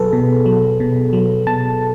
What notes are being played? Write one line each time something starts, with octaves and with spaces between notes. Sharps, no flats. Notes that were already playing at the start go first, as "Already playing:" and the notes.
Already playing: B2 F#3 G#4 A4 B4
B2
F#3
B2
F#3
B2 A5